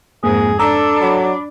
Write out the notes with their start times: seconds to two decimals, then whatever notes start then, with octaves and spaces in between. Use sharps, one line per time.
0.24 F2 G#2 A#3 G#4
0.59 D4 A4 A#5 D6 E6
1.01 F#3 B5 D6